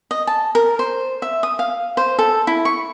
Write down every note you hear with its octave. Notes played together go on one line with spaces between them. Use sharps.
D#5
A5
A#4
C5
E5
D#6
F5
C5
A4
E4
C#6